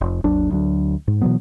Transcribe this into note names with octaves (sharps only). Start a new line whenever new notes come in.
F1
G#1 D#2 F#3 D4
D2 F#3 D4
G#2
B2 E3 F#3 B3